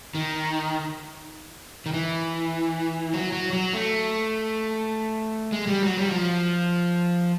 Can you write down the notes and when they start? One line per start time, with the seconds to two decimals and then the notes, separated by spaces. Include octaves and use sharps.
0.15 D#3
1.86 D#3
1.93 E3
3.13 F#3
3.33 F#3
3.53 F#3
3.73 A3
5.52 G#3
5.68 G3
5.83 F#3
5.97 G3
6.06 F#3
6.12 F3